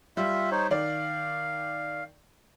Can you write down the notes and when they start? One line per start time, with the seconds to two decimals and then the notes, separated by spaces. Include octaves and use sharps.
0.17 G3 F4 E5
0.52 D#4 C5 C#5
0.71 D#3 D5 F5